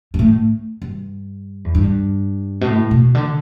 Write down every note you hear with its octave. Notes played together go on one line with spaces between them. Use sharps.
G2
A2
G2
E2
G2
B2
A2
B2
D3